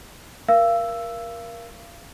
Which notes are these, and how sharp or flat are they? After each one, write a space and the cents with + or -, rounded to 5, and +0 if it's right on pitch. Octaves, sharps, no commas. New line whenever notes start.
A#4 +15 F5 -30 E6 +5